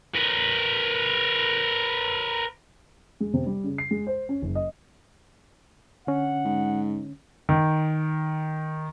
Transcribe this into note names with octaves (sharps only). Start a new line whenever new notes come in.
A#4 B4
G#3
C3
G3
C#3
C7
G#3
C5
C#4
F#1
D#5
D3 C#4 F#5
G#2
D#3